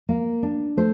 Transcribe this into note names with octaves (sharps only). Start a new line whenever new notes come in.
A#3
D4
A3 C5